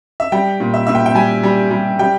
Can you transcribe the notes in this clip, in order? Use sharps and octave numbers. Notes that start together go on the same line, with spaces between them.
E5
G3 G5
A#2
E5
A#2 E5
G5
G5
G3 G#5
G3
G3
G3 G5